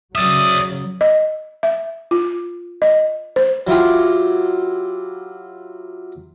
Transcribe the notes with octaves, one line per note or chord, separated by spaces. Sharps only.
C#3 F#3 D5 E5 D#6
D#5
E5
F4
D#5
C5
F#3 E4 F4 G4